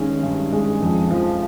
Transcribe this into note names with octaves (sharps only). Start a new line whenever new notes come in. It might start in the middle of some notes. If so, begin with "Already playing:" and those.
Already playing: G2 D#3 G#3 C#4
G2
G#3
F2
F3